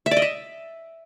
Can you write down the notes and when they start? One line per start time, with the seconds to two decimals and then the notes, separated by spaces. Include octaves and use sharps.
0.06 E5
0.11 D5
0.17 D#5
0.22 E5